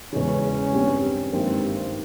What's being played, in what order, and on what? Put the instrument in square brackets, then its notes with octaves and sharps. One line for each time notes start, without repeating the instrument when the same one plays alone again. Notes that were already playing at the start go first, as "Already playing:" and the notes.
[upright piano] E1 E2 C#3 [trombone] C#4
[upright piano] G2 G3 C4
[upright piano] G#1 G2 G3 A#3 [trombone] C4